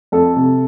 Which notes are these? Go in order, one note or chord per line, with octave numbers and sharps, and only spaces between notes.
F2 A4
C3